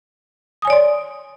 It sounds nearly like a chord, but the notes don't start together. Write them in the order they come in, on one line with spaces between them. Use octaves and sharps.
D#6 G#5 C#5 D5 C6